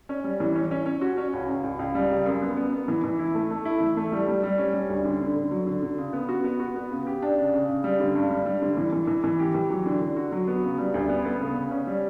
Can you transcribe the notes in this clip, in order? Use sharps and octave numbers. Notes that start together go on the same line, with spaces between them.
C#4
G3
E3
C#4
C#4
C#4
F#4
C#4
C#2
C#2
C#2
C#2
G3
C#3
F#2
B3
B3
B3
E3
E3
E4
A3
A3
E4
E3
A3
G3
G3
G3
C#4
G3
D2
D3
D3
D3
F#3
D3
D3
C#3
B3
F#4
B3
F#4
B3
C#3
G4
D4
C#3
C#3
C#3
G3
D3
G2
G3
G3
D3
E3
E3
E3
E3
G4
E3
F#3
D3
D3
F#4
F#3
B3
C#3
G3
D2
B3
B3
C#3
C#3
C#4
G3